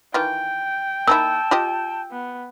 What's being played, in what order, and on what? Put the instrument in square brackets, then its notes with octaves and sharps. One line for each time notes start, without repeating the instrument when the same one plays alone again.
[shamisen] D#3 E3 F4 [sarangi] G5
[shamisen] A#3 D#4 E4 [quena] A5 [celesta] E6
[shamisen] F4 G4 D#5
[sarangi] B3